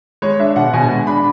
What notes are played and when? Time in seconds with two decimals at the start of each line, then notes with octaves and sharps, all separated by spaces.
0.22 G#3 C#5
0.39 D4 E5
0.56 B2 F#5
0.73 B2 G#5
0.90 G#3
1.07 D4 B5